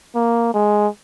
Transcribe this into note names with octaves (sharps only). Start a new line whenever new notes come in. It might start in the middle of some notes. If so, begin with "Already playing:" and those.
A#3
G#3